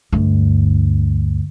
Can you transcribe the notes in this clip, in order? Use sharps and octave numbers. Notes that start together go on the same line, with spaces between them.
D2 G2